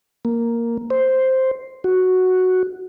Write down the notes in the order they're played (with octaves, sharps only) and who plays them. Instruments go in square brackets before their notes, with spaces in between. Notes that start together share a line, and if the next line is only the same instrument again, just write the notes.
[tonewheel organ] A#3
C5
F#4